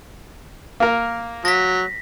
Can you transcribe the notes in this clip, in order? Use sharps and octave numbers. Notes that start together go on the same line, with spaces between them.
A#3 A#4
F#3 A#6 B6